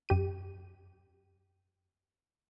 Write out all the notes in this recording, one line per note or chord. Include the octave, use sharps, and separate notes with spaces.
F#2 G4 D#7